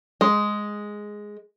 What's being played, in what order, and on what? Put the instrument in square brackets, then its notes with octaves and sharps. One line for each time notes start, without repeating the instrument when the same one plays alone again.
[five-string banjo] G#3